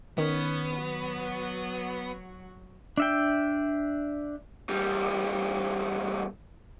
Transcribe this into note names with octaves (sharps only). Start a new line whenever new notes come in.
D#3 B3 C#4
F#3 F#4
D4 E5 G5
E2 G3